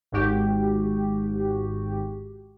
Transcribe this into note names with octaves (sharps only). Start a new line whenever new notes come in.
G#1 G#2 F#4 G4